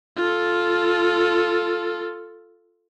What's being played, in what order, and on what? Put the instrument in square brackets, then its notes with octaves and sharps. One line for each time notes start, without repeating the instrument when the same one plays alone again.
[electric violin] F4 A4